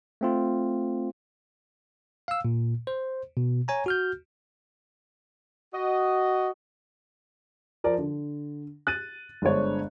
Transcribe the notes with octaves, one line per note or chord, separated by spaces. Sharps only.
A3 C4 F4
F5 E6
A#2
C5
B2
C#5 G#5 A#5
F#4 F6 G6
F#4 D#5
F3 A#4 D5
D3
F#6 A6 D#7
G1 G#3 D4 C5 C#5